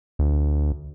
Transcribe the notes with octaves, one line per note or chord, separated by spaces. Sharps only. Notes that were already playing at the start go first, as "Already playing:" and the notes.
D2